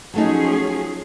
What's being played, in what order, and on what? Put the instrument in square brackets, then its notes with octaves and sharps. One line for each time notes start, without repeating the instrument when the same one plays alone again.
[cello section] F3 C#4 G#4 [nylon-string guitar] F#3 A3 D#4